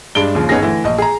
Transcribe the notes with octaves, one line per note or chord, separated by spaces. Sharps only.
G2 G#3 D4 D7 G7
D#2 C#3 F3
G1 B3 C#4 D#4 G#4 A#6
D3 E3 A3
A#1 D#5
G#4 A#5